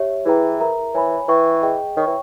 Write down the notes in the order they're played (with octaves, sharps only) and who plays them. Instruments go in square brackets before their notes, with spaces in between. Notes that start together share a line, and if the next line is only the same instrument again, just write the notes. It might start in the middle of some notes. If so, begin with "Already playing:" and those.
Already playing: [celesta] G4 C#5 E5
[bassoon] E3 [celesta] E4 G#4 B4 G5 A#5
[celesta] A#4 E5 A#5
[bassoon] E3 [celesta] C#5 G#5 B5
[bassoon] E3 [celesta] B4 G5 C#6
[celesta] G#4 D#5 G5
[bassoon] D#3 [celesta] C#5 G5 C#6
[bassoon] E3